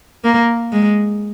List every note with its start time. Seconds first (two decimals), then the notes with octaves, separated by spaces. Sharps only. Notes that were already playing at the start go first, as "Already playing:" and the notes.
0.24 A#3
0.72 G#3